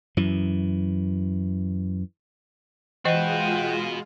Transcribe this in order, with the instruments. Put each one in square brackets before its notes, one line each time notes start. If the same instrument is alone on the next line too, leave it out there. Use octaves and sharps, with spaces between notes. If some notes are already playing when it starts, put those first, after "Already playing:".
[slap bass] F#2 E3
[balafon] E3 D#5 [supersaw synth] G#3 F4 [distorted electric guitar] F#4 B4 [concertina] F#5 G5